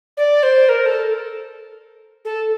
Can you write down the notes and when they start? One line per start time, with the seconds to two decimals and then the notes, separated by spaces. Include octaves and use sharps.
0.17 D5
0.43 C5
0.69 A#4
0.86 A4
2.25 A4